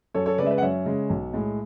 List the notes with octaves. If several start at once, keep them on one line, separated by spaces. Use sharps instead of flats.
F#2 A4 C#5
A4 C#5
C#3 G#3 B4 D5 E5
B4 D5
F#5
F#2 C#5 E5
C#3 G#3
B1
A2 G#3